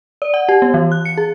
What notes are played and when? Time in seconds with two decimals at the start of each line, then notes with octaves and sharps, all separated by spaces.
0.22 D5
0.34 F#5
0.49 G4
0.62 B3
0.74 E3
0.92 F#6
1.05 C#7
1.17 G#4